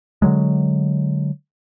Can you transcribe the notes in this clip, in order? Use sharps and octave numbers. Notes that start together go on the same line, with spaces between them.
D3 D#3 F#3 G#3